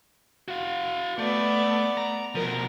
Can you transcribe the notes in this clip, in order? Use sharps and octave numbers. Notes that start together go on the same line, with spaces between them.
F#4 F5
A3 B3 D5
A#5
B2 F3 A#4